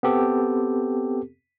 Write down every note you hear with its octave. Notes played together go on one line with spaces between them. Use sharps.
B3 C4 G4 A4